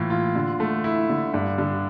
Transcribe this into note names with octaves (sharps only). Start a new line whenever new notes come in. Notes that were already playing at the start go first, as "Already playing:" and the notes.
Already playing: A2 E3 F4
F4
D3
A3
E4
D3
G2
D3